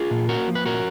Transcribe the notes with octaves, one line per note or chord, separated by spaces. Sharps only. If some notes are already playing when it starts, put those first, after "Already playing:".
Already playing: F4 G#4
A#2
A#3 F#4 A#4
F3
B4
A#2 F#4 A#4